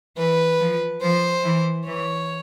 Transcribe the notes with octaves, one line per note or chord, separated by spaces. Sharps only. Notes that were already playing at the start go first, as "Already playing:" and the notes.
E3 B4
F3
F3 C5
E3
E3 C#5